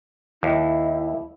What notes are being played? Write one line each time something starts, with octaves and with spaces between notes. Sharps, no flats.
D#2 E4